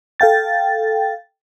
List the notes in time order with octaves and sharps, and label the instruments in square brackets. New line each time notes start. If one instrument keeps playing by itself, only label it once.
[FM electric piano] A4 F5 G5 A6